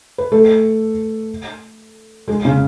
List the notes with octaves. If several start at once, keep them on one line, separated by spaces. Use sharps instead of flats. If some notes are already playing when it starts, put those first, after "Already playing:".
B4
A3 A4
G#3 G#4
C#3 C#4